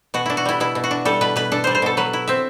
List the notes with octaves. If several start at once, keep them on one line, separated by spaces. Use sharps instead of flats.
B2 F#4
D4 E4
F#4
G3 E4
B2 E4
B2
F#4
D4
G3 A4
B2 B4
B2 B4
D4 A4
G3 C5
C5
B2 A4
F#3 B4
E4
C4 E5